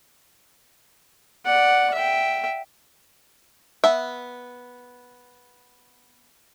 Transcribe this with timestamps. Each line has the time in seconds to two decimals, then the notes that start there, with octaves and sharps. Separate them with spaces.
1.46 D5 F#5
1.94 E5 G5
3.84 B3 E5